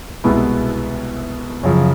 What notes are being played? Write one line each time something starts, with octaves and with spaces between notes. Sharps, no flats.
C2 B2 G#3 B3 E4
F#2 C#3 F3